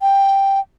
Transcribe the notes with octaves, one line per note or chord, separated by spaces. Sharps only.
G5